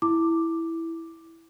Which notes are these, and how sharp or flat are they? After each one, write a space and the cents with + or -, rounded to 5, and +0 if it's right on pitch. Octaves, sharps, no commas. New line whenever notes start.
E4 +0 D6 +5